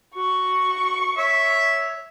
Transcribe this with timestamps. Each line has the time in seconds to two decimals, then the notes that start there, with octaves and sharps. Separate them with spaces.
0.15 F#4 C#6
1.17 C#5 E5